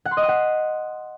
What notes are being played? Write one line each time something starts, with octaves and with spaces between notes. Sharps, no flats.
F#5
C6
D#5
D#6
F#5